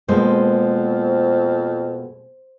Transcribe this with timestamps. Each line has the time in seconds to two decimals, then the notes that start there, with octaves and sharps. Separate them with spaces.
0.08 F2 B2 G#3 A#3 C5